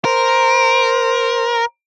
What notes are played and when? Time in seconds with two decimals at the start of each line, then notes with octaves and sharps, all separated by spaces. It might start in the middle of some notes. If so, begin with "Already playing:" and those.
0.05 A#4 C5